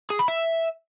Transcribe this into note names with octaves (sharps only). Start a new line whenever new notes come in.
G#4
B5
E5